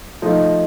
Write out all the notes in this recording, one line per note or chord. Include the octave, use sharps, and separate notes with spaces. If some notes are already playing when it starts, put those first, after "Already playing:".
F3 A3 D#4